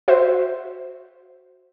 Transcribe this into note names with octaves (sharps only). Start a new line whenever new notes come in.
F#4 C5 E5